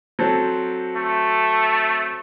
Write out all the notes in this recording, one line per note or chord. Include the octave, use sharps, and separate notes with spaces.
F#3 C4 A4
A3